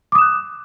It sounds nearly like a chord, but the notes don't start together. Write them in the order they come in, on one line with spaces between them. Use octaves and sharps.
D6 D#6 E7 F#6